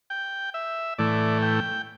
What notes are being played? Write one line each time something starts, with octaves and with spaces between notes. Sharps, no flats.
G5
E5
A2 E3 A3 D5
G5